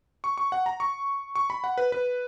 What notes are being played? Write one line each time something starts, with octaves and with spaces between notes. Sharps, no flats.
C#6
C#6
F#5
A#5
C#6
C#6
B5
F#5
B4
B4